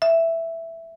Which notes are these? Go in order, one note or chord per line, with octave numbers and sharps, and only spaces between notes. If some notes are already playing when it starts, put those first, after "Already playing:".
E5